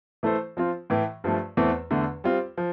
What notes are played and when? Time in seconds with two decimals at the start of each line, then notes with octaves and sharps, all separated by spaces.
0.23 E3 A3 E4 A4 C5
0.57 F3 C4 F4
0.90 A2 E3 A3
1.24 G2 F3 A3
1.57 E2 E3 A3 C4
1.91 E2 D3 A3
2.24 G3 C4 F4
2.57 F3